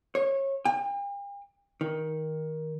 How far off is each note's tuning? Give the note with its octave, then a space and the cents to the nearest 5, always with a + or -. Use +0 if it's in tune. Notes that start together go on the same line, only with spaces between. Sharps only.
C#5 -25
G5 +45
D#3 +10